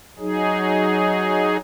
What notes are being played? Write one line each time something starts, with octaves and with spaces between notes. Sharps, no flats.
F#3 D#4 G#4